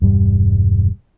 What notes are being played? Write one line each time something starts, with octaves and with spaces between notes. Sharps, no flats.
E1 G2 G3